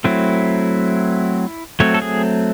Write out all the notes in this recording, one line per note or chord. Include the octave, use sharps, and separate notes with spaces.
F#3 A3 C4 E4
F#3 A3 C4 C#5
A4
G#4